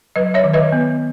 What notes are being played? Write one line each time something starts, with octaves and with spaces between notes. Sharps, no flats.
F#3 B4 D#5
C#5 E5
D#3
B4 D#5
B3